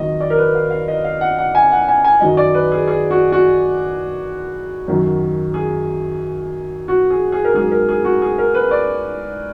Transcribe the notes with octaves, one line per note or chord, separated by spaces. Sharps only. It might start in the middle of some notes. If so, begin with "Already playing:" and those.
Already playing: F2 D#3 F#3 D#5
D5
A#4
B4
F5
F5
D#5
F5
F#5
F#5
G#5
F#5
G#5
G#5
F#2 D#3 F#3 D#5
D5
B4
G#4
G#4
F#4
F#4
F#2 D#3 F#3
G#4
F#4
G#4
G#4
A#4
G#2 F#3 G#4
A#4
G#4
F#4
G#4
A#4
B4
D5